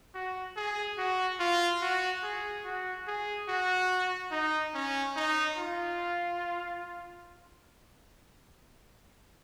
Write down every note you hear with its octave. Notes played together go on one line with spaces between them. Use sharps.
F#4
G#4
F#4
F4
F#4
G#4
F#4
G#4
F#4
D#4
C#4
D#4
F4